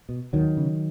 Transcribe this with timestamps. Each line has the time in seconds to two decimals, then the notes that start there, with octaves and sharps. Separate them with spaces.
0.09 B2
0.33 D#2 D#3 F#3
0.57 C#3